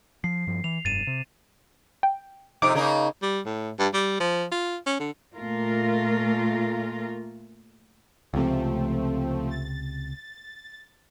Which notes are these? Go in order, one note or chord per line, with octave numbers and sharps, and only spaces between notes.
F3 C7
G2 F3
E3 F7
F1 G2 A6 D#7 E7
C3
G5
F2 C3 D#4 D6 D7
C#3 A#3 D#4
G3
A2
G2
G3
F3
F4
C#4
D3
A#2 A3 F4 A#4
C#2 C3 F3 A3 C4
A6